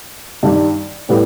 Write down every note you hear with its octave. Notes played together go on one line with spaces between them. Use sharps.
G2 D#3 G3
A2 G3 B3